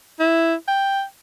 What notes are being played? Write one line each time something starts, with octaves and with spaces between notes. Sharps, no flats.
E4
G5